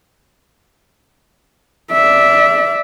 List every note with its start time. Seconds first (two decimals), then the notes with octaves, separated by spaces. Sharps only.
1.92 D5 E5